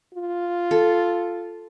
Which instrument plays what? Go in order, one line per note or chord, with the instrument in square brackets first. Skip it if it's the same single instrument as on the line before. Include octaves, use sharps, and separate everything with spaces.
[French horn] F4
[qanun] A4